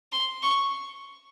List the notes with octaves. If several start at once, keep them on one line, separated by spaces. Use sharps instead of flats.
C6
C#6